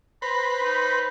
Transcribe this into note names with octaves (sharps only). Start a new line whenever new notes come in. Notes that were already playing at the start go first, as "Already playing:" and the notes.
B4 C5 A#5 B5
D#4